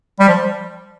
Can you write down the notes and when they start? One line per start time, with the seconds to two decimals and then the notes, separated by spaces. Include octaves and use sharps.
0.20 G3
0.28 F3